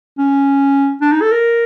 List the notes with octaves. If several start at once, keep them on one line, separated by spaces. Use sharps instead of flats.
C#4
D4
D#4
A4
A#4